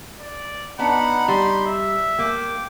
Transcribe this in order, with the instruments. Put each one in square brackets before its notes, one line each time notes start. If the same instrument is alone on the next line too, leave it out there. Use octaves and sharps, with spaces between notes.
[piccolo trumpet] D5
[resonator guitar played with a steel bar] B3 D4 [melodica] D#4 B5 [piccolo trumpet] F#5
[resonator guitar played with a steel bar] G3 [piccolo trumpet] C6
[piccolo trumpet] E5
[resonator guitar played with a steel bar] A#3 [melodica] G5 D6